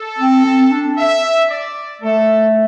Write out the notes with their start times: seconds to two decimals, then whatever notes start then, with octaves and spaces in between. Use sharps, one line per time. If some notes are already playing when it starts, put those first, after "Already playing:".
Already playing: A4
0.19 C4
0.45 C4
0.71 D4
0.97 E5
1.49 D5
2.01 A3 A4